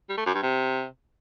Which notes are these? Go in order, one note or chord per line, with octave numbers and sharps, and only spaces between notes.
G3
A3
F#2
G2
C3